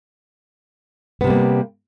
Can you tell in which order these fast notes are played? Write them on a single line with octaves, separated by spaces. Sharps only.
B3 C3 G3 A#3